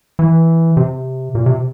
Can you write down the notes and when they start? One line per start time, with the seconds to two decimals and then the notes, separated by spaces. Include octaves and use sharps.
0.19 E3
0.77 C3
1.35 A#2
1.46 C3